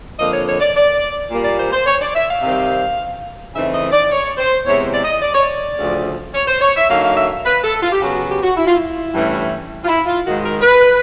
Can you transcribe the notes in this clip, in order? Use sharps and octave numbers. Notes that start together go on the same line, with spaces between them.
F2 D3 F3 A#3 D#5
C#5
C#5
D5
D5
A#2 G3 A#3
D5
C5
C5
C#5
D5
E5
F5
C3 D#3 G3 C4
C#3 E3 A3 C4 D#4 E5
D#5
D5
C#5
C5
E2 C3 E3 G#3 C#5
D5
D#5
D5
C#5
D5
D2 C#3 F3
C#5
C5
C#5
E5
D3 F#3 A#3 D#4 F5
F5
E5
B4
A4
F4
G4
C#3 F#3 B3 F#4
F#4
G4
F#4
E4
F4
E4
G2 E3 A3 C#4
F4
E4
F4
G#2 D#3 G#3 F#4
A#4
B4